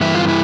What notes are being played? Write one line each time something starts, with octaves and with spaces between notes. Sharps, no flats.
G2 E3 E4
F4
E4